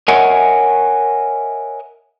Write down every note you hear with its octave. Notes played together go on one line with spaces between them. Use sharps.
A#4 C#5 D#5 E5 F#5 G#5